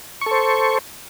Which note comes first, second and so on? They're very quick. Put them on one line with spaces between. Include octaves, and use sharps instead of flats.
C#6 A4 C5